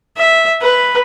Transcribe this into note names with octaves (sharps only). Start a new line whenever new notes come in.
E5
B4